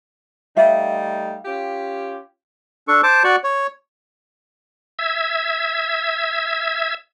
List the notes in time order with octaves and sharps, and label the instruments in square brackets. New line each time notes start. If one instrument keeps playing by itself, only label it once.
[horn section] G3 A3 D#4 [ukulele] E5 F5
[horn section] C#4 F4 G4
[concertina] D4 A4 C#6
C5 A5 D6
F#4 D5 C#6
C#5
[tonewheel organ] E5 E6 G#6